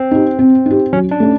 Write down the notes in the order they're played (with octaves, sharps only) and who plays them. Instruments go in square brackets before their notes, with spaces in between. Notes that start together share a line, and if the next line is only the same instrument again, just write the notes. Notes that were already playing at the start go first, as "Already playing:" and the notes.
Already playing: [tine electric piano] C4
[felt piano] D#4 G4
C4
D#4 G4
[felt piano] F#3 [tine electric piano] C#4
[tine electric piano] D4
[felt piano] A3 C#4